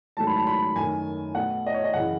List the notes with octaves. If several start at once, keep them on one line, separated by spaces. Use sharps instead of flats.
G#2 D#3 F#3 A3 A5
B5
A5
B5
F#2 D#3 A3 G#5
B2 A3 F#5
D#5
C#5
D#5
F#2 C#3 E3 F#5